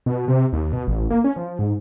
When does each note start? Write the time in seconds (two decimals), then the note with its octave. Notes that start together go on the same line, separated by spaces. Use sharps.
0.06 B2
0.28 C3
0.53 D#2
0.73 B2
0.88 A1
1.10 A#3
1.24 C#4
1.36 F3
1.59 G#2